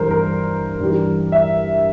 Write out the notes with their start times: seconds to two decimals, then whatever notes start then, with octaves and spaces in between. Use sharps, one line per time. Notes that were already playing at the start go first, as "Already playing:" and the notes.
Already playing: G2 E3 G3 A#4 C5
0.11 A#4
0.80 G2 E3 G3
1.32 E5